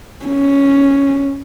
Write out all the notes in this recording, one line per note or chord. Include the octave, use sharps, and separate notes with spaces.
C#4